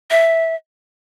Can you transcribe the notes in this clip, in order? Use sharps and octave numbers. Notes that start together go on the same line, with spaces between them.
E5